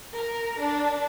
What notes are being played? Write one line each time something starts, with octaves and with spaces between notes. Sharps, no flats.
A#4
D4